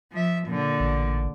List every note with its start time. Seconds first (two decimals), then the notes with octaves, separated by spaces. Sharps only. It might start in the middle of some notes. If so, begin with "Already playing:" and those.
0.12 F3 E5
0.47 A#2 D3
0.80 A1